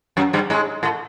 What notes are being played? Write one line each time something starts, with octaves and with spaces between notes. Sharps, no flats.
F#2 F#3
G2 G3
G#2 G#3
A2 A3